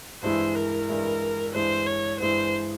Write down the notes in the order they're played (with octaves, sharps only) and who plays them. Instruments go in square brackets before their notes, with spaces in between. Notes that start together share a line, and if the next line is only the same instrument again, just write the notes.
[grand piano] G2 E3 G#3 E4 [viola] C5
[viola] A#4
[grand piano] G2 E3 G#3 E4
[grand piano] G2 E3 G#3 E4 [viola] C5
[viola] C#5
[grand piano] G2 E3 G#3 E4 [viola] C5